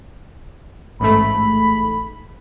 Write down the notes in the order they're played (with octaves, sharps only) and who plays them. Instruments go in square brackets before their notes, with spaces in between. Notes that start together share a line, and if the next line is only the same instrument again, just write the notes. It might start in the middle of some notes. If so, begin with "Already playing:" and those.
[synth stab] A1 G#2 A3 [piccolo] B5